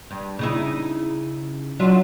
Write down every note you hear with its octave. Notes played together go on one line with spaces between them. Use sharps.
G2
C#3 D#4 E4
F#3 D4 F4 E5